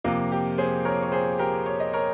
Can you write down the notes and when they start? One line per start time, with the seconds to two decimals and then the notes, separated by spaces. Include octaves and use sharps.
0.04 F2 C3 F3 A#3 F4
0.32 G4
0.58 G#4 C5
0.85 A#4 C#5
1.02 C#5
1.12 G#4 C5
1.39 G4 A#4
1.66 C#5
1.80 D#5
1.93 A#4 C#5